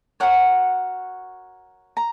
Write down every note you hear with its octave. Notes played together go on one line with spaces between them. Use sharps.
F#4 A#4 C#5 F#5
A#5